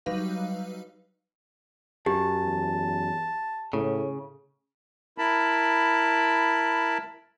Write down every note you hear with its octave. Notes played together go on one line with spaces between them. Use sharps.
F#3 G3 D#4 B4 F5
F#2 G4 A5
E2
A2 C#3
E4 A#4 A5 B5